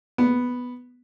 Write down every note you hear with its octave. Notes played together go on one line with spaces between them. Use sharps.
B3